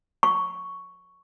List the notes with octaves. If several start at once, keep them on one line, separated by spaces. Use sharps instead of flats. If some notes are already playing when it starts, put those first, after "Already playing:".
C#6